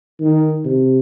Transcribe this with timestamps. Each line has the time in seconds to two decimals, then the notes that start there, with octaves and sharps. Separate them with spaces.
0.21 D#3
0.65 C3